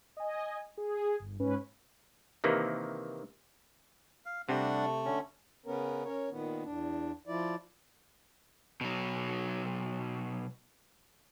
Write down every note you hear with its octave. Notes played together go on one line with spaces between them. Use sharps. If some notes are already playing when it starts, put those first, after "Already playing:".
D#5 G#5
G#4
G1
G#2 C#4 B4
C3 D#3 E3 A#3
F5
C3 G3 A3 C4 D4 F#5
D3 C#4
C#3 B3 C#4 A#4
C#4 A#4 C#5
A#2 D#3 B3
E2 D4
F3 E4 D5
B2 F#3